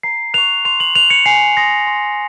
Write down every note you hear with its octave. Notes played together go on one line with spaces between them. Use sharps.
A#5 C7
C#6 F#6 F7
C6 F7
F#7
F#6 F7
C#7
G#5 C7
C6 D#6 A#6
C6